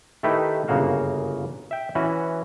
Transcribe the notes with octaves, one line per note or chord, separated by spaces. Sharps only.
D#3 A3 D#4 E4 G4 B4
G1 F#2 C#3 A#3 F#4 F5
E5 G5
E3 C#4 F#4 B4